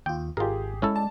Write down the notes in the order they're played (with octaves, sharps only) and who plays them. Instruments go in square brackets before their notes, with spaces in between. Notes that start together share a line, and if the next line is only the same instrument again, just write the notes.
[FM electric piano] D#2 F4 [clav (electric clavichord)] G5
[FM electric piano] G#1 [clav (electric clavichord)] F4 A#4 [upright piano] G4 G#4
[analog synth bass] G#3 [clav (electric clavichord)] C#4 E4 A4
[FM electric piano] D5 [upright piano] A5